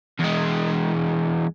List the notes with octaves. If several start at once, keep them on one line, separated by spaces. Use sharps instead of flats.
E2 G#3